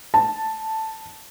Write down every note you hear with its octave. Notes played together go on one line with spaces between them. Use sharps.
A5